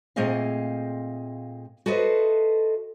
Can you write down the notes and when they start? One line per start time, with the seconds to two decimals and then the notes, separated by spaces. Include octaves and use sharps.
0.16 A#2 A3 C4 G#4 D#5 F5
1.86 F#4 A4 B4 C5 D#5 E5